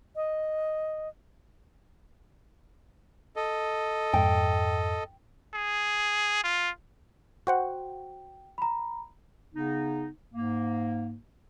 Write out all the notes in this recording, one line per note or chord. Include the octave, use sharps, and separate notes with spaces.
D#5
A4 D#5
F2 G#2 G5
G#4
F4
F#4 C5 F#5 G5
A#5 B5
C#3 B3 D#4
G#2 A#3